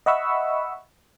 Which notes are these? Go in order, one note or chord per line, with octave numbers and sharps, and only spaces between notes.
D#5 E5 F#5 B5 C#6 E6